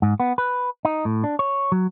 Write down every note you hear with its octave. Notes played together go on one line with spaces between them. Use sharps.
G#2
B3
B4
D#4
A2
D4
C#5
F#3